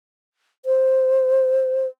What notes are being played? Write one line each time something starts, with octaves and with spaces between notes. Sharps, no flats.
C5